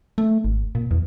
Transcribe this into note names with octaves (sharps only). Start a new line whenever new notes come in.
A3
G#1
A#2
E2